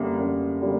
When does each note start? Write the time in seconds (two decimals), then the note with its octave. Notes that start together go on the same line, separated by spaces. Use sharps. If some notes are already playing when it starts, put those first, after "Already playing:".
Already playing: F#2 D3 G3 A#3
0.18 F#2
0.61 D3 G3 A#3